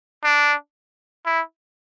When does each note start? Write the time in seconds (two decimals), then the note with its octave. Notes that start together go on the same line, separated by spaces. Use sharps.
0.24 D4
1.26 E4